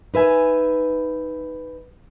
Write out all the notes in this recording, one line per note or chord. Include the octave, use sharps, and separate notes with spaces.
D#4 B4 E5 G#5